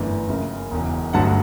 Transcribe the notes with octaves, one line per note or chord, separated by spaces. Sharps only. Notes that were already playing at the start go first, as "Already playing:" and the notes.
Already playing: G1 F#2 E3 A3 D4
F#1 F#2 C#3
E1 E2 C#3
G1 G2 D3 F#3 A3 F#5 A5